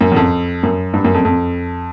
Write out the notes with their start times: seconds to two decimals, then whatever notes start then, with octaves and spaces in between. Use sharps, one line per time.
0.01 F#2
0.12 E2
0.16 F2
0.63 F#2
0.94 G2
1.04 F#2
1.14 F2
1.25 F2